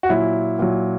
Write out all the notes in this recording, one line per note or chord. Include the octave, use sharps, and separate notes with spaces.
F#4
A#2 F#3 E4
A#2 F#3